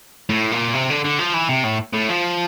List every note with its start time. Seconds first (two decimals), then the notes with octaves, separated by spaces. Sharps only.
0.30 A2
0.52 A#2
0.74 C3
0.90 D3
1.05 D3
1.19 F3
1.34 E3
1.49 C3
1.64 A2
1.94 A2
2.09 F3